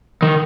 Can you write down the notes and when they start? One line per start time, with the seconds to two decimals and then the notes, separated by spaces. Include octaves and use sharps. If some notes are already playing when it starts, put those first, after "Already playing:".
0.22 D#3